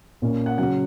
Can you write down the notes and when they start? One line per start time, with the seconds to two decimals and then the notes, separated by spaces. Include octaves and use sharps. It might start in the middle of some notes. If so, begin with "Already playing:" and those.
0.22 A#2 A#3 C#4
0.46 F#5
0.58 C#3 F#3 C#4 F#5